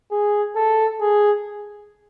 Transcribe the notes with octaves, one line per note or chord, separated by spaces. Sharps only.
G#4
A4
G#4